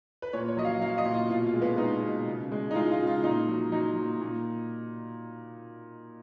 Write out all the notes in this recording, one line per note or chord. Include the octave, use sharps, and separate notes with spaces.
B4
A#2 C#5
C#5
F#3 D#5
F5
F#3 F5
D#5
A#2
F4
B2 F4
F4
G#3
B3
G#3 D#4
B2
C#3
G#3
D#4
G#3 F4
F4
C#3
F4
A#2 D#4
F#3
F#3 D#4
A#2
A#2